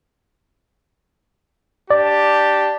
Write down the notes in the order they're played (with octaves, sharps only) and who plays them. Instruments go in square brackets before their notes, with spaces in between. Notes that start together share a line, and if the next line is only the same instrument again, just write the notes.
[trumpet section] D4 G4 A5 [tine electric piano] D5